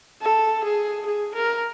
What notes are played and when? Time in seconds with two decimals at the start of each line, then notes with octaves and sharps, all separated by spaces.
0.22 A4
0.64 G#4
1.06 G#4
1.35 A#4